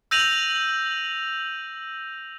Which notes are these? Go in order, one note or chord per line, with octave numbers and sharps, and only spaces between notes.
E6 G6 A#6 D#7 F7 F#7